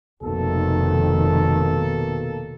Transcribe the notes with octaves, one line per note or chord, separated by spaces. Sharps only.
F1 B2 D#3 A#3 A4